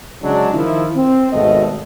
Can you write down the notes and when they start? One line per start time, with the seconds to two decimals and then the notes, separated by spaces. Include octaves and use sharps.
0.22 C#3 F#3 G#3 D4
0.54 D#3 F3 E4
0.96 C4
1.33 G#1 D#2 B2 A3 D#5